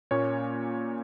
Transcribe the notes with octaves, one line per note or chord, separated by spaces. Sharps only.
A#2 A#3 C#4 C#5